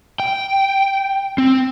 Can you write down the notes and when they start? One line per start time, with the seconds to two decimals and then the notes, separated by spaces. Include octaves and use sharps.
0.20 G5
1.38 C4